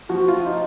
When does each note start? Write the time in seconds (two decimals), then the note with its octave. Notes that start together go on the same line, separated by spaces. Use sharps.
0.09 F3 F#4
0.28 F4
0.46 D#4